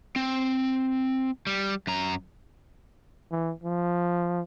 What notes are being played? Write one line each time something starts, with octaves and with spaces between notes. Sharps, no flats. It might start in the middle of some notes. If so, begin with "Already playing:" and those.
C4
G3
F#2 A#5
E3
F3